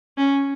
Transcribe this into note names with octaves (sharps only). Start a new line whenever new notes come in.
C#4